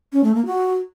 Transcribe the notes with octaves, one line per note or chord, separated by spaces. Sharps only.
C#4
A3
A#3
F#4